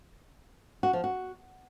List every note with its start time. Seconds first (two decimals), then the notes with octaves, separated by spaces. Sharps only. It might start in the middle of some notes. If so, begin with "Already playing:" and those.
0.83 F#4
0.93 F3
1.04 F#4